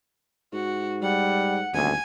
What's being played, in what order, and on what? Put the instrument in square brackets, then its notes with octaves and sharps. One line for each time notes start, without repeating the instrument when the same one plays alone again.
[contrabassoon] G#2 [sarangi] F#4
[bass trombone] G3 [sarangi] F#5
[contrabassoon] D#1 [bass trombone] D2 [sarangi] G#5